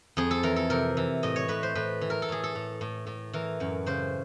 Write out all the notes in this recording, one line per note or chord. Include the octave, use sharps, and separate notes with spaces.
F2 G#4
A4
E3 A#4
A4
C3 A#4
E3
A2 D#5
C#5
A2 B4
C5
A2 B4
E3
A#4
A4
A2 G#4
A4
A2
A2
A2
E3 A#4
F#2
C#3 C5